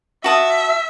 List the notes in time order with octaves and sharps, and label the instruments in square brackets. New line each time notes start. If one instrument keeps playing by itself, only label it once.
[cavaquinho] F#4 A5 D#6 [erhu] E5